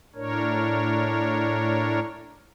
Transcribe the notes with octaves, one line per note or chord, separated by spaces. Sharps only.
A2 D4 A#4 C#5